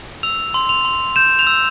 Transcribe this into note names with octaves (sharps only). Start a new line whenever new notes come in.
E6 F7
C6
F7
C6
G6 E7
F7
E6